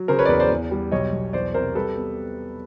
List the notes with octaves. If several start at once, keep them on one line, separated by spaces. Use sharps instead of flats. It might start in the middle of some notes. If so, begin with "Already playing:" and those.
Already playing: F#3
C#3 A#4 C5
B4 C#5
D5
E2 B4 C#5
C5 D5
E2
G3
B1 C#5 D#5
B1
E2 C5 D5
C3 A#4 C5
G3 A4 B4
B3